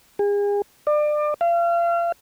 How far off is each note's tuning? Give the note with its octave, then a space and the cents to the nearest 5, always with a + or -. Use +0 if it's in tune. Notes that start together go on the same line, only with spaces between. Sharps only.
G#4 -35
D5 +30
F5 -35